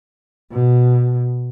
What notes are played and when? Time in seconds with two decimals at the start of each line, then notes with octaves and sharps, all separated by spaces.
0.51 B2